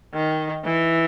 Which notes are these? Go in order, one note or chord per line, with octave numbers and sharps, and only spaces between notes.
D#3
E3